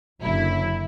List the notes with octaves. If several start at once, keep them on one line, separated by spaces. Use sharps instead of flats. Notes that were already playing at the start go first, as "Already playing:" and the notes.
F#1 D3 F#3 E4